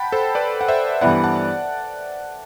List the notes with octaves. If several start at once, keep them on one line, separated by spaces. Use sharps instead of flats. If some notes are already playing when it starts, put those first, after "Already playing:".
Already playing: F#5 G5 A5 B5
A4 C5
B4 D5
F#5
C5 E5
G2 E3 B3 E4 D5 F#5
F#5 A5